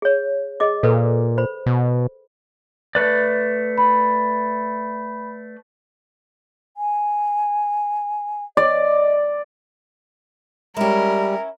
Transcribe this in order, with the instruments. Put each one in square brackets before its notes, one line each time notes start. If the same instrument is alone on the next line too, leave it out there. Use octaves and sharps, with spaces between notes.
[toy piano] G#4 C#5
G#4 D#5 D6
[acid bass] A#2 [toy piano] A4 B4
[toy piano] C5 B5
[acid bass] B2
[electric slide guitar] A3 B4 D5
[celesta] B5
[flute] G#5
[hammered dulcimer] D5 [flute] D#5
[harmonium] G3 [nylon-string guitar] G#3 G4 [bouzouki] C#4 E4 [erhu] A#4